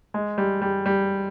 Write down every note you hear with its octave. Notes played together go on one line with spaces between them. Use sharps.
G#3
G3
G3
G3